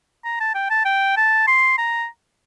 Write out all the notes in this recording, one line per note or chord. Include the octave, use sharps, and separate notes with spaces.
A#5
A5
G5
A5
G5
A5
C6
A#5